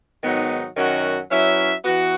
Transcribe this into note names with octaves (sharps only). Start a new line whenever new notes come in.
G#2 D#3 F#3 B3 D#4
F#2 D#3 F#3 C#4 F#4
F#3 C#4 E4 B4 E5
E3 B3 F#4